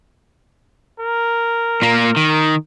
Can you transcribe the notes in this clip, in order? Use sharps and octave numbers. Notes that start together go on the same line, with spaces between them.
A#4
A#2 A#3
D#3